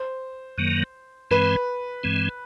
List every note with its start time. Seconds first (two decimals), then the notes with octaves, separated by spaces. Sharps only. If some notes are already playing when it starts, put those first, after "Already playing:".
Already playing: C5
0.58 F#2 D#3 F#3 A#3
1.31 G2 E3 G#3 C4 B4
2.03 G2 E3 G#3 C4